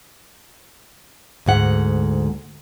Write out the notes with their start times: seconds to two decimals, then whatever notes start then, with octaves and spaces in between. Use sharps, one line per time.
1.46 D2 G#2 F#5